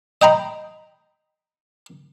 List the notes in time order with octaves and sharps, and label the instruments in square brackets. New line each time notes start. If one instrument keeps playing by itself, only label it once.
[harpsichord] D#5 G5 A#5 B5